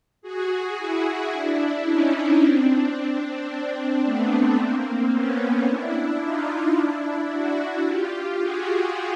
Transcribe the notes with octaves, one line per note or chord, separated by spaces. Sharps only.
F#4 G#4
E4 F#4
D4 E4
C#4 D#4
C4 D4
C4 D4
A3 B3
A#3 C4
B3 C#4
D4 E4
D#4 F4
D4 E4
E4 F#4
F4 G4
F#4 G#4